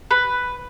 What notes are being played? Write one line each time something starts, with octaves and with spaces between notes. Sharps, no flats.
B4